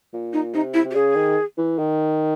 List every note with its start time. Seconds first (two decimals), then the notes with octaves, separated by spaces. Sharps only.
0.13 A#2
0.33 D#4
0.54 C3 D#4
0.74 E4
0.85 C3
0.91 G4
0.95 C#3 G#4
1.15 D#3
1.57 E3
1.78 D#3